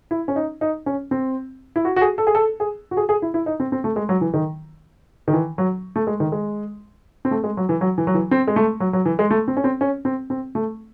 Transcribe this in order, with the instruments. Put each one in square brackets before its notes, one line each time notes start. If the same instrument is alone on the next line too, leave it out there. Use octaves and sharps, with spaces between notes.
[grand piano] E4
C#4
D#4
D#4
C#4
C4
E4
F#4
F#4
G#4
A4
G#4
A4
G#4
F#4
G#4
G#4
E4
E4
D#4
C4
C4
A3
G#3
F#3
E3
D#3
D#3
E3
F#3
A3
G#3
D#3
G#3
C4
A3
G#3
F#3
E3
F#3
E3
F#3
E3
C4
G#3
A3
F#3
F#3
E3
G#3
A3
C4
C#4
C4
C#4
C4
C4
A3